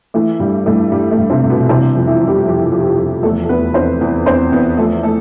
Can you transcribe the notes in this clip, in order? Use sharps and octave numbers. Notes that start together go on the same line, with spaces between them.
E3 A3
G2 G3
G2 A3
G2 G3
A3
G2
C3 C4
G2
B2 B3
C3 E3 C4
F2
E3 E4
F2
G3 G4
F2
F2
F2
E2 A3 A4
A4
E2 B3 B4
E2 C4 C5
E2
E2 C4 C5
E2 B3 B4
F3 A3 A4
A3 A4